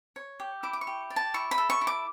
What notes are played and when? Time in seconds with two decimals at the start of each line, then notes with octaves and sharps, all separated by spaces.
0.16 C#5
0.40 G4
0.63 E4 D6
0.73 D6
0.81 C#6
0.87 G4
1.10 D5
1.16 A5
1.34 E4 C#6
1.51 B5
1.58 A4
1.70 C#6
1.81 E4
1.87 D6